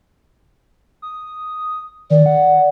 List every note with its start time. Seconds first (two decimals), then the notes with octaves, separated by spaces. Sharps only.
1.02 D#6
2.10 D#3 D5
2.26 F#5